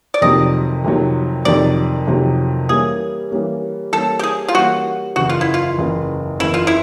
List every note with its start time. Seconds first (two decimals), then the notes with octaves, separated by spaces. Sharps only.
0.14 D5
0.21 F2 C3 D#3 F#3 D#5
0.84 F2 C3 D#3 F#3
1.45 F2 C3 D#3 F#3 D5
2.07 F2 C3 D#3 F#3
2.69 E3 G3 A#3 C#4 G#4
3.31 E3 G3 A#3 C#4
3.92 E3 G3 A#3 C#4 A4
4.19 G4
4.23 G#4
4.48 F4
4.54 E3 G3 A#3 C#4 F#4
5.16 F#1 E2 C#3 F#4
5.29 F4
5.41 E4
5.54 F4
5.78 F#1 E2 C#3
6.39 F#1 E2 C#3 E4
6.54 F4
6.67 E4